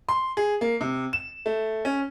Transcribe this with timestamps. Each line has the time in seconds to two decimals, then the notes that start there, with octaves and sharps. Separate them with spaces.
0.09 C6
0.37 G#4
0.61 A#3
0.81 C3
1.13 E7
1.46 A3
1.85 C#4